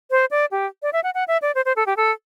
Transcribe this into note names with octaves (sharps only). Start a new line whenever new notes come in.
C5
D5
G4
D5
E5
F#5
F#5
E5
D5
C5
C5
A4
G4
A4